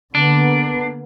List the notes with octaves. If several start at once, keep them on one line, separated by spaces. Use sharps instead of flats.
D3 A#3 B3 D4